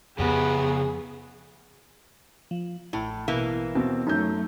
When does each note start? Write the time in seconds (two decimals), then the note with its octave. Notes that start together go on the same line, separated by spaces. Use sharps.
0.19 F2 C#3 B3 G4 G#4
2.51 F3
2.93 A1 A2 E4
3.28 B2 E3 A#3
3.75 D#2 B2 C4
4.07 F#2 F#3 A3 D#4 G6